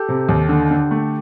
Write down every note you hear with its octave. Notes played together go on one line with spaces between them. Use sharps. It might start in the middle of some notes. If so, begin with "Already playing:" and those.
Already playing: G4 A4
C3
D#2
D3
D3
A3